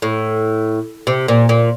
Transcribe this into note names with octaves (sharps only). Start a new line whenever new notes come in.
A2
C3
A#2
A#2